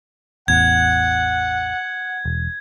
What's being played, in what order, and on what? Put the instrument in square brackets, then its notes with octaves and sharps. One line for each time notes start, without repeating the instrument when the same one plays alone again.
[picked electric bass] A1 E2 [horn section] F#5 [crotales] G#6
[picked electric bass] E1